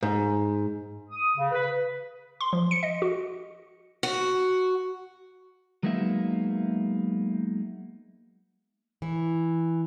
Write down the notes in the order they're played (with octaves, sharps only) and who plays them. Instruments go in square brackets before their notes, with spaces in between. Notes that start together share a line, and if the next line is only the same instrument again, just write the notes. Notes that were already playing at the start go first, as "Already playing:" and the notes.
[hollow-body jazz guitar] G#2
[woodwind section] D#6
C#3
B4
[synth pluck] C6
F3
C#7
D#5
F#4
[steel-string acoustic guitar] F#4
[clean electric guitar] F#3 G#3 A#3 B3 D#4 E5
[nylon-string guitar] E3